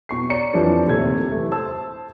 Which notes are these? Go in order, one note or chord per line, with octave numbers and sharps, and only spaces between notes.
B2 C#6 C7
C#5 D5 A#5 C#7
F2 E3 F3 G3 D4
D#1 D#2 C3 A3 G#6
E3 A3
C5 A5 E6